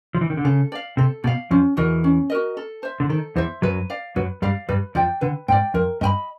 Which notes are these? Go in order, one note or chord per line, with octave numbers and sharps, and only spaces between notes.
F3
E3
D#3
D3
C#3 A4
D5 F5
C3 A4
B2 D5 F5
F2 F3 C#4
E2 E3 F#4 A#4 D#5
C#4
F#4 A#4 D#5
A4
C5 E5
D3
D#3 A4
E2 E3 C5 E5
F#2 F#3 B4
D5 F5
F#2 F#3 B4
G2 G3 D5 F5
G2 G3 B4
F2 F3 D5 G5
D3 B4
G#2 D5 G5
F2 A#4
G2 D#5 G5 B5